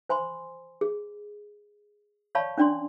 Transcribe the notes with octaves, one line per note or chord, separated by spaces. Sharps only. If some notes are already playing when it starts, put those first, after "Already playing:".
C5 G#5 B5 C6
G#4
C#5 D5 F5 A5 B5 C#6
C#4 D4 D5 G#5 C6